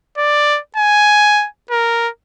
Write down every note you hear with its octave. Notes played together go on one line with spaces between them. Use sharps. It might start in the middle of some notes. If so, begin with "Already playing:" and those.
D5
G#5
A#4